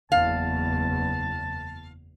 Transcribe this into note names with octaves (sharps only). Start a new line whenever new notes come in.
F#1 E2 F5 A5